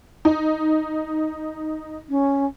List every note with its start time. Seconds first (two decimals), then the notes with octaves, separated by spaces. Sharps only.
0.25 D#4
2.10 C#4